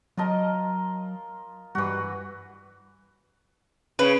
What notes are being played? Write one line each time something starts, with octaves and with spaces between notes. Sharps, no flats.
F#3 F4 A#4 D#5 A5
G2 E3 G3 F#4
C#3 B4